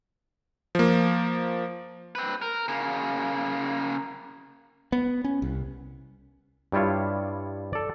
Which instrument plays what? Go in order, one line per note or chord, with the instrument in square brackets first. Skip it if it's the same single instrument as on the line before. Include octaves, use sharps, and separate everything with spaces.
[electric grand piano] F3 A#3
[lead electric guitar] C4 B4
A#4
C#3 A#3
[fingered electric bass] B3
C#4
C2
[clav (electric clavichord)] G2 G3 E4 F4 C#5
A4 D5